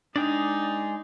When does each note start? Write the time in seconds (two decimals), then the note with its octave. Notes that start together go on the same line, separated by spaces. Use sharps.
0.16 G#3 D4 D#4 G#4 D5 G5 D#6